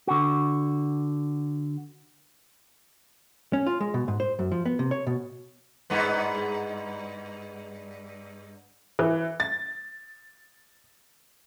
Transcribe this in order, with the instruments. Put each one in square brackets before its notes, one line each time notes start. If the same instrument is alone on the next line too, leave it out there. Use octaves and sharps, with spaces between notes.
[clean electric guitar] D3 F#4
[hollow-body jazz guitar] C#4
F4
G#3
B2
G#2
C5
F#2
F3
B3
C3
C#5
B2
[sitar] G2 G#3 B3
[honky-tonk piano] E3
A6